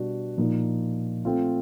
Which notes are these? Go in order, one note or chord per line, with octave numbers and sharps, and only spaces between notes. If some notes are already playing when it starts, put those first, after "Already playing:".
Already playing: B2 G3 B3 D4 F#4
A#2 F3 A#3 D#4
A3 C4 F4